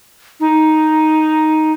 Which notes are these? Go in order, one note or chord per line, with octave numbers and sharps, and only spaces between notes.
D#4